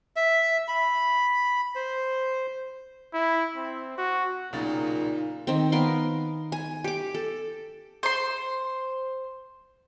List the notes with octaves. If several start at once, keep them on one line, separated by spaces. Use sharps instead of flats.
E5
B5
C5
E4
C4
F#4
B1 A#2 C#3 D#4 A6
D#3 C4
B3 A#4 F5 C6
G#5
G4 D6
A4
C5 C6